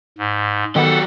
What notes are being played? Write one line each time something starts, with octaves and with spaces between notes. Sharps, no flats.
G#2
D#3 F#3 B3 G4 A4 F#5